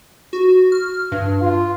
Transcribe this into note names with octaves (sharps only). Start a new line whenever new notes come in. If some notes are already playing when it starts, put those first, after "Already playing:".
F#4
F6
G2
F4